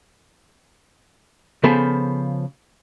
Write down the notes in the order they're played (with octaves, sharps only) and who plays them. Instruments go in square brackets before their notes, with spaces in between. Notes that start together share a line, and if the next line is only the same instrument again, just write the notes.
[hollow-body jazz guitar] C#3 F3 B3 G#4 A4 C5